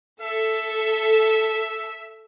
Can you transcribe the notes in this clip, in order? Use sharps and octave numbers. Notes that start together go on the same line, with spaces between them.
A4 E5